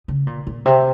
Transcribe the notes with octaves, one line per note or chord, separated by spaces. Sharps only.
C#3
A#2
A#2
C3